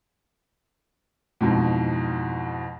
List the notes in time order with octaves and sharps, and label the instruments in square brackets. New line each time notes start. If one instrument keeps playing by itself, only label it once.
[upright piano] F2 G#2 B2 E3